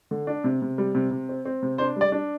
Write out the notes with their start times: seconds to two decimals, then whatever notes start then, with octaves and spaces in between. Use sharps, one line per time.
0.11 D3
0.27 D4
0.44 C3
0.62 C3
0.78 G3
0.95 C3
1.11 C3
1.29 C4
1.45 C4
1.62 C3
1.78 D4 C5
1.96 G3 D5
2.12 D4